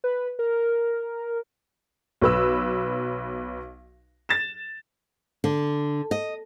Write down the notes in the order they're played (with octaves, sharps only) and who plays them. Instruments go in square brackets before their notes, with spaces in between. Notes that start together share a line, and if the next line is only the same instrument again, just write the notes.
[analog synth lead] B4
A#4
[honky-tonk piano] B1 B4 E6
A6 E7
[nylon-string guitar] D3
D#5